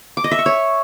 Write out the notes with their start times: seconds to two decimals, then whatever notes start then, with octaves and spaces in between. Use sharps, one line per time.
0.17 D6
0.24 D#5
0.31 E5
0.39 C#6
0.46 C#5